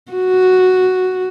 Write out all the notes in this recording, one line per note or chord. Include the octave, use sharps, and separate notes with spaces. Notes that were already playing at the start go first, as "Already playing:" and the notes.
F#4